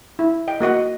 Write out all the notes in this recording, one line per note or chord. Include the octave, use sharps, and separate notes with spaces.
E4
D#5 G5
A#3 F#4 D#5 F#5